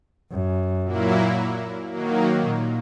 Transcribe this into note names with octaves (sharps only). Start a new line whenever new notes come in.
F#2
A#2 F#3 A#3 E4
D#3 F#3 A#3
A#2